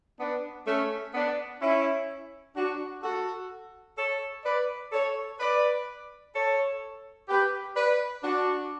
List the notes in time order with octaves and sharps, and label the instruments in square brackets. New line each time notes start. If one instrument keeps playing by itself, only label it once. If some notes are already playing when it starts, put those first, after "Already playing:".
[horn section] B3 D4
A3 C#4
B3 D4
C#4 E4
D4 F#4
F#4 A4
A4 C#5
B4 D5
A4 C#5
B4 D5
A4 C#5
G4 B4
B4 D5
D4 F#4